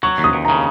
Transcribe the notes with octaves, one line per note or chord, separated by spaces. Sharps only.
F#3 C#6
D#2
D#6
D#2
C#3 A#5